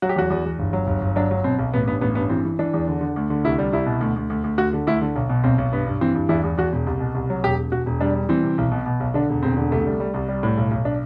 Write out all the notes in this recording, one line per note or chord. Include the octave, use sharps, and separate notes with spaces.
F#3 F#4
G4
E2 F#4
E2
E2
G1
F#3
G1
G1
F#3 D4
F#3
B2 C4
B1
A1 B3
G2 B3
A1 B3
G2 B3
E3 C4
E3
E3 D4
E2
D3
D3
D2
D3
C2 E4
G3
C2 E4
B2
D2
D2
D2
D2
D2 F#4
D3
D2 E4
D3
B1
B2
B1 C4
B1
G2 B3
G2
E3 C4
G2
E2 E4
E2
E2 F#4
E1
C2
B2
C2
F#3
E1 G4
E1
E1 F#4
E1
G3 D4
G3
E3 C4
C3
B1
B2
B2
B1
D3 D4
E1
E1 C4
D3
C2 A3
G3
G3
C2
G3
A2
B1
B1
D4